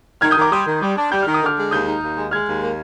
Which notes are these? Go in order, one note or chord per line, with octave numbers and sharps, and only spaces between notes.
D#3 F6 G#6
D#6 G6
D#3 A#5 D6
G3 C6 D#6
D#3
G3
D4
G3 G6
D#3 F6
D#6
D3 D6 F6
G#3
D#2 D#6 G6
D#4
D#2
G#3
G#3 F6 G#6
D#2
A#3